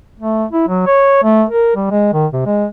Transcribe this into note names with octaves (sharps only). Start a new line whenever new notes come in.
A3
E4
F#3
C#5
A3
A#4
G3
G#3
D#3
C3
G#3